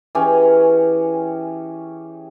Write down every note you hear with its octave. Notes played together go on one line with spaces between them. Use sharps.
E3 C#4 G4 G#4